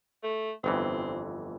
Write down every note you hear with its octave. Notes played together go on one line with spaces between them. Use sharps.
A3
G1 F2 E3 C4